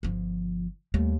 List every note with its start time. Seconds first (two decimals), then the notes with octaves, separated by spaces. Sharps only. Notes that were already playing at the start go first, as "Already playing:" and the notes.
0.03 G1 F3
0.94 D#2 G3 A3